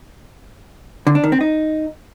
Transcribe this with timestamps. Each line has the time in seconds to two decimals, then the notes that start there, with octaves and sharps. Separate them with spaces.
1.07 D3
1.15 D4
1.24 D#3
1.32 C4
1.41 D#4